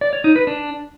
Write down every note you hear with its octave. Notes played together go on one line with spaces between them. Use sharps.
D5
C#5
D#4
B4
D4